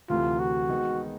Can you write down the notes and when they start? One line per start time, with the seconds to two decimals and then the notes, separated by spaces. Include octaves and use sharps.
0.10 D2 C3 E3 A3 F4
0.40 F#4
0.69 D#3 G#3 B3 D#4